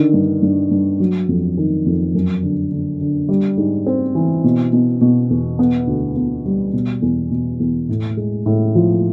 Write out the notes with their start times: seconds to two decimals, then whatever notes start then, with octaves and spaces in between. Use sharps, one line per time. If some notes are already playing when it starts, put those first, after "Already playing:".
Already playing: D3 D#3
0.14 G2
0.43 G2
0.71 G2
1.00 F#3
1.29 F2
1.57 D#3
1.86 F2
2.15 F#2
2.43 D3
2.71 D3
3.01 D3
3.29 G3
3.57 G#2
3.86 C4
4.15 E3
4.44 B2
4.73 B2
5.01 B2
5.30 E2
5.59 B3
5.87 D2
6.16 B3
6.45 G3
6.73 B2
7.02 E2
7.31 B2
7.60 E2
7.89 A2
8.17 G#3
8.46 A2
8.75 F3